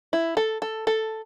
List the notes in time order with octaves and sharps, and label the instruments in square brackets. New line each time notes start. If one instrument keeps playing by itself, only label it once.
[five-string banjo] E4
A4
A4
A4